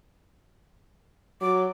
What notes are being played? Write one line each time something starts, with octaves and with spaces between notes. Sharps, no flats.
F#3 D6